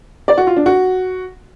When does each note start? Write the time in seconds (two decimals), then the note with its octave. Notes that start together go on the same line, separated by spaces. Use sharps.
0.28 D5
0.37 F#4
0.47 F4
0.56 D4
0.66 F#4